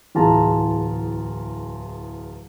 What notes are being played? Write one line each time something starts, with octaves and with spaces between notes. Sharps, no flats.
D1 E2 F4 G#4 A5 A#5